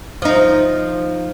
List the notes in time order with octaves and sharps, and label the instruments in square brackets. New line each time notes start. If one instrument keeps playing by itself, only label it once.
[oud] F3 D#4